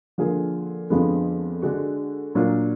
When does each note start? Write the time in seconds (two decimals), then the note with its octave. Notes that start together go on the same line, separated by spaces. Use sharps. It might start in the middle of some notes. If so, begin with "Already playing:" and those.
0.18 D3 F3 A#3 F4 G#4
0.90 F2 D3 F3 G#3 B3
1.62 D3 G#3 D4 F#4
2.35 A#2 F#3 D4 F4